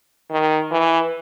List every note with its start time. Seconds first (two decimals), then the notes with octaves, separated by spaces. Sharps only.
0.31 D#3
0.71 E3